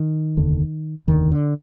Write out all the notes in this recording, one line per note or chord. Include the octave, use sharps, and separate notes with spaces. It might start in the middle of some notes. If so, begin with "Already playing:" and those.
Already playing: D#3
F1 D#2 D3
F1 D#2 D3 D#3
D3